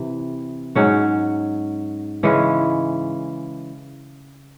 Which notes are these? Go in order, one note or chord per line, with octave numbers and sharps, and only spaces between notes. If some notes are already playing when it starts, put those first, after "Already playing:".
Already playing: C3 E3
G#2 F#3 C#4 F#4
C#3 E3 G#3 C#4